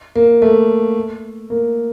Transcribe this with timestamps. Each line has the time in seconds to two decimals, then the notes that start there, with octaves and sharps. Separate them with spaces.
0.15 A#3
0.42 A3
1.50 A#3